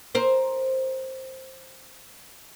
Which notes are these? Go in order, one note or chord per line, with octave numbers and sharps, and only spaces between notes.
A#4 C5